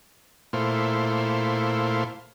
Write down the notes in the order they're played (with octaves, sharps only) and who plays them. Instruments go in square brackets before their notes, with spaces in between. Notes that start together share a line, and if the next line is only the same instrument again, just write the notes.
[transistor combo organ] A#2 A3 E4 C5 F5